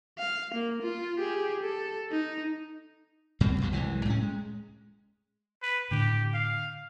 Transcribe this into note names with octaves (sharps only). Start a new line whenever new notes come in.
F5
A#3
F4
G4 G#4
A4
D#4
F#2 B2 G3 C4
B1 F2 B2 F#3
C2 E3 F#3 G#3
A2 C#4
G#3
B4
A2 D3 G4
F5